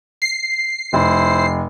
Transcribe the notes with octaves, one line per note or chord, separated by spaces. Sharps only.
C7
F1 E4 C5